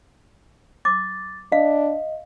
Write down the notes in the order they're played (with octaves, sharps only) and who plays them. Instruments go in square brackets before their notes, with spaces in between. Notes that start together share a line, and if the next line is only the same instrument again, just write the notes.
[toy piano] D6 [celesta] A6
[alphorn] D4 [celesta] D#5 [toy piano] F5